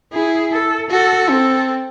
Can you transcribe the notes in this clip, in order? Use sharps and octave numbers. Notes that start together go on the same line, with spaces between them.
E4 G#4
A4
F#4 A4
C4 A4